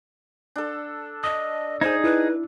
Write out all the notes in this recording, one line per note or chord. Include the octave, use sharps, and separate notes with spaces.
D4 A4
D#5 D#6
D#4 G#4 C5 G#6
E4 B4